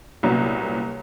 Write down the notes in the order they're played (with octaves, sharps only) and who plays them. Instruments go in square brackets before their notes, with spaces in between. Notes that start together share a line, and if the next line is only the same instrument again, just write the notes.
[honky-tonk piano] C2 A#2 F#3 B3 C#4